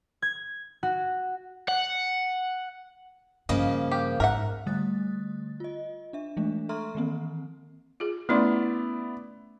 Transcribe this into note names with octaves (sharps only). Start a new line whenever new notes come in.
G#6
F#4
F#5
G2 C#3 F3 A#3 D#5
G4
G#2 A#4 E5 F#5
D3 G3 A3 D#6 F#6 A6
F4 D#5
D4 E5
E3 G#3 A3 D4
A4 E5 A#5 C6 C#6 F6
D#3 E3 A#3 C4
F4 G#4
A3 B3 C#4 E4 D5 C6